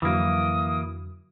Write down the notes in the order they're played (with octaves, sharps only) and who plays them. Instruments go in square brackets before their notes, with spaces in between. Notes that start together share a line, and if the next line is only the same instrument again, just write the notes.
[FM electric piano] F2 D3 F#3 [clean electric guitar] E3 A#3 [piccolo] D#6